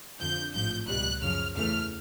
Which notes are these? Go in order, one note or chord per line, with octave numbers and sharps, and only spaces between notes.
F2 D3 F3 G6
A1 G#2 F3 G6
C#2 B2 G3 F#6
F#2 C#3 F3 F6
E2 C#3 E3 A3 F6